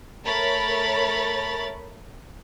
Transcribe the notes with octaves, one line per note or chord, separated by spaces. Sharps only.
A3 A#4 C#5 B5 A6